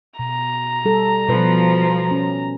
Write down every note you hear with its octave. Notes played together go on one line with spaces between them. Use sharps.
B2 A#5
G3 A4
B2 F3 B4
C#4